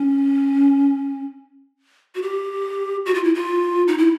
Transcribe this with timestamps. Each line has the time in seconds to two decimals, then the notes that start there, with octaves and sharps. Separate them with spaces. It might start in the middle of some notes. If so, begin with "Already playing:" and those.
Already playing: C#4
2.15 F#4
2.22 G4
3.06 F#4
3.14 F4
3.24 E4
3.35 F4
3.88 D#4
3.98 E4